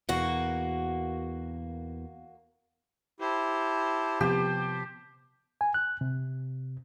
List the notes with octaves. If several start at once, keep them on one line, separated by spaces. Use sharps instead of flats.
E2 B2 A#3 F#4
E4 G4 C5 A5
C3 F3 B3 G4
G#5
F#6
C3